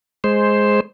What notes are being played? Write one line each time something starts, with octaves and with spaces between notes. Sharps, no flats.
G#3 C5